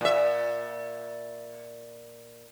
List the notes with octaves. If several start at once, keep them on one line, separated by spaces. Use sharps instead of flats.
A#2 E5